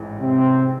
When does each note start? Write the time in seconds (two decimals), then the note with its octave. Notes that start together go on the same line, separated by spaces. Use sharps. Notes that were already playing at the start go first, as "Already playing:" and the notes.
Already playing: A1 G#2 E3
0.21 C3 C4